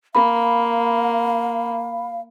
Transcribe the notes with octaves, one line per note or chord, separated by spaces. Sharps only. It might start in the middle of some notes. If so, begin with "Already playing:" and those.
A#3 F5 B5